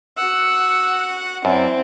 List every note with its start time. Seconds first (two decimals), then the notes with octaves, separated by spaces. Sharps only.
0.18 F#4 F#5 E6
1.45 F#2 C4 E4 D5